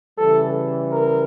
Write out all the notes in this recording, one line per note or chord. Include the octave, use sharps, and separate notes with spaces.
C#3 E3 G3 A4
A#4